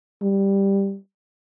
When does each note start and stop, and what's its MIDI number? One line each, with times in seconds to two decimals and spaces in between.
0.21 0.96 55